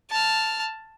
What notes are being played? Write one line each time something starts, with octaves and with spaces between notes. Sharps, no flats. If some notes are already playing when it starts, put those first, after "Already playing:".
A5 F6